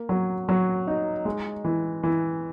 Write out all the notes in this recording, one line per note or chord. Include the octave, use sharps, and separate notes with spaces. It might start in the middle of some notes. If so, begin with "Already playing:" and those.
Already playing: A#3
F#3
F#3
D#4
G#3
E3
E3